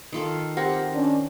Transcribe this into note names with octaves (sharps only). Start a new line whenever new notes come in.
D#3 F4 A4
C4 G4 A#4 F#5
D#3 C#4 D4